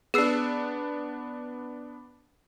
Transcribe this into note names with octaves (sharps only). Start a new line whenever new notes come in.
B3 D4 G#4 E6 C7